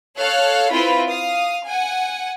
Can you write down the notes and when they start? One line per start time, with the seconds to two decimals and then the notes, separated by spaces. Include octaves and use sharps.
0.17 A4 C#5 F5 F#6
0.72 C4 E4 F4 B4 B5
1.07 F5 D#6
1.66 F#5 G#5